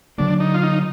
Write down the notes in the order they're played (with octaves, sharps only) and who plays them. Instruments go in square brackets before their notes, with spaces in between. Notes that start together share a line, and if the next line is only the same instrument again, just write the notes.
[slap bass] D3 F#3 A#3 [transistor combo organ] D4
[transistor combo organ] D#4
F4
D#4